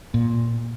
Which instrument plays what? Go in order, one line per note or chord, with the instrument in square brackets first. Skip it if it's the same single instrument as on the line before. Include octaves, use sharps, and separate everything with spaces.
[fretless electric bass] A#2